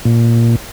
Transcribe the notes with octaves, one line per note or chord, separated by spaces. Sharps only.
A#2